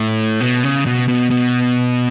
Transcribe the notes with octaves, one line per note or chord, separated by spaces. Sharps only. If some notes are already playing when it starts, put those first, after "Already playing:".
Already playing: A2
B2
C#3
B2
B2
B2